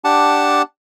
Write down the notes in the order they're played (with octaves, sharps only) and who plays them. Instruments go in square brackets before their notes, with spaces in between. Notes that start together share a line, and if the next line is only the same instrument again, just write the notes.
[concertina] D4 G4 F#5 A5